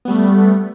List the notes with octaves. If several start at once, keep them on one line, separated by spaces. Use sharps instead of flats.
G3 A3 B3